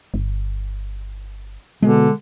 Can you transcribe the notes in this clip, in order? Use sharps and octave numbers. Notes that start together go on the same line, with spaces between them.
G1
B2 D3 G#3